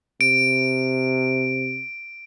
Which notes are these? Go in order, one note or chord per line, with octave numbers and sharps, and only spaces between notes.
C3 D7